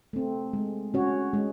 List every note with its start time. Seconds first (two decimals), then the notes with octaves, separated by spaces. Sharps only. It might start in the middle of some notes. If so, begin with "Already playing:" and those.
0.13 A3 C4
0.53 G#3
0.94 C#4 F#4 C#5
1.34 G#3